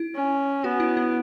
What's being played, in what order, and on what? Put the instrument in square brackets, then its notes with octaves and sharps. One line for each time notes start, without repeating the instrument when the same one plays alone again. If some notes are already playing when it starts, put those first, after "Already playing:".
Already playing: [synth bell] E4
[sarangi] C#4
[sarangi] B3 [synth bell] F#4
[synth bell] E4
E4